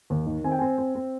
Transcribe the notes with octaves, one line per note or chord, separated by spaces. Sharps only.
D#2
D#3
C4 G#5
G5
C4 G#5
C4
C4